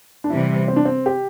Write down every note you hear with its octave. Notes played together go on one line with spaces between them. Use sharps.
D4
C3 E3 G3 E4
C4
D4
C4
G4